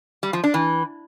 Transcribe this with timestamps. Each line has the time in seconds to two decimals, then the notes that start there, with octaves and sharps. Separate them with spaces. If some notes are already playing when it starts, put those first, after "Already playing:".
0.23 G3
0.33 F3
0.44 D4
0.54 E3